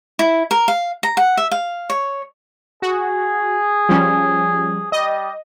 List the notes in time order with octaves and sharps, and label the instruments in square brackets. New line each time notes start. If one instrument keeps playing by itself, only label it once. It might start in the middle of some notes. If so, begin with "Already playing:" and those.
[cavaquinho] E4
A#4
F5
A#5
F#5
E5
F5
C#5
[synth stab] F#4 [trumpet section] G#4
[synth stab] F3 G3 C#4
[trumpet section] G3 G4 [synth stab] D#5